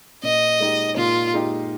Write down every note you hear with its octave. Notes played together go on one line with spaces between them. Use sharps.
A#2 D#5
G#3 D#4 G4
A#2 F4
G#3 D#4 G4